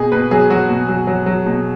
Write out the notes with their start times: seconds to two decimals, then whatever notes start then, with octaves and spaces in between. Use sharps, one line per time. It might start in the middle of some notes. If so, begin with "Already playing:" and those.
Already playing: B2 G#4
0.12 B2 B4
0.31 F#3 G#4
0.50 F#3 F#4
0.69 B2
0.88 F#3
1.07 F#3
1.26 F#3
1.46 B2